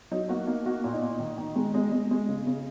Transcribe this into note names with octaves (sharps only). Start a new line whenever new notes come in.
F#3 D#4
A#3 F#4
A#3 D#4
A#3 F#4
A#2
D#4
A#2
D#3
D#3
G#3
G#3 D#5
G#3
G#3
C#3
C#3